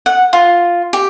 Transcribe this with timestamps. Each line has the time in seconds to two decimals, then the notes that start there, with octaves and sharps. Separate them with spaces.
0.06 F#5
0.33 F4
0.93 G4